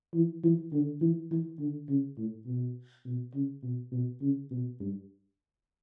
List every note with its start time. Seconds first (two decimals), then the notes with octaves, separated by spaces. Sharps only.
0.14 E3
0.43 E3
0.72 D3
1.01 E3
1.31 E3
1.59 D3
1.89 C#3
2.17 A2
2.46 B2
3.05 B2
3.34 C#3
3.63 B2
3.92 B2
4.21 C#3
4.51 B2
4.80 G2